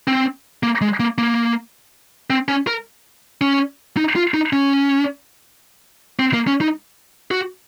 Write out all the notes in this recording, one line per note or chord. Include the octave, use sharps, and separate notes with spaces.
C4
A#3
G#3
A#3
A#3
C4
C#4
A#4
C#4
D#4
F4
D#4
C#4
C4
A#3
C#4
D#4
F#4